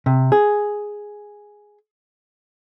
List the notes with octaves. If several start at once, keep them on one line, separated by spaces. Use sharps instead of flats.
C3
G#4